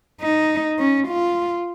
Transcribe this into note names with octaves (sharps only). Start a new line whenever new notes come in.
D#4
C#4
F4